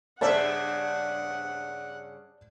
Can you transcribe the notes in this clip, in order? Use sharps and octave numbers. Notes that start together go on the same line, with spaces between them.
G2 C#3 C5 D5 E5 F#5 A5